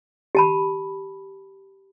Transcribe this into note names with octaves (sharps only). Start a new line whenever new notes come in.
G4 A5 B5